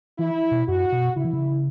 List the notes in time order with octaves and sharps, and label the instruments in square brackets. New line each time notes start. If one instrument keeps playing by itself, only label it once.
[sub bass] E3 [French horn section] E4
[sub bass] B2
[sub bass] F#2 [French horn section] F#4
[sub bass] B2
[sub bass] C#3 [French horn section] E4
[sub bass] E3
C#3